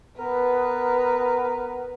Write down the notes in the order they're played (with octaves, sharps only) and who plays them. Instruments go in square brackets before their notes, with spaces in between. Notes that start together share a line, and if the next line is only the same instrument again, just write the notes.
[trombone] B3 [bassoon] A#4 [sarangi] B4